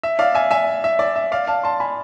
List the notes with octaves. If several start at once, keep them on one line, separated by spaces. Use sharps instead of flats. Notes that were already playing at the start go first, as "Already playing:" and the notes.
E5
D5 F5
E5 G#5
E5 G#5
E5
D5
E5
D5 F5
F5 A5
A5 C6
G#5 B5